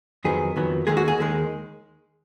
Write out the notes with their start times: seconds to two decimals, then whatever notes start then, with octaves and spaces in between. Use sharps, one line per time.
0.25 F2 D#3 F#3 B3 G#4
0.56 F2 D#3 F#3 B3
0.87 D#2 D#3 G#3 G#4
0.97 F#4
1.08 G#4
1.18 D#2 D#3 G#3